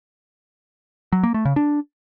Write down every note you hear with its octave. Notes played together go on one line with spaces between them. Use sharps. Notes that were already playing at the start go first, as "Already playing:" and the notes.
F#3
A#3
A3
C#3
D4